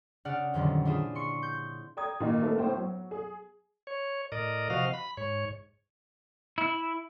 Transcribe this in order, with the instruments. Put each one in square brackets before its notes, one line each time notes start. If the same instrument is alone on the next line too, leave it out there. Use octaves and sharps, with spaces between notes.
[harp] C#3 D4 D5 F#5 F6
F2 A#2 D3 D#3 F#3 G3
D4 E4 F4 G#4 E7
C6 C#6 C#7
G6
[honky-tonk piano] D5 G5 A#5 D#6 G#6
A#2 D#3 D#4
A3 B3 A4 A#4
G1 A2 C5 G5
F#3
G#4
[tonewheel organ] C#5
A2 A#4 D5 D#5
C3 F3 F#4 D#5 F5
B5
G#2 C#5
[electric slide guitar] E4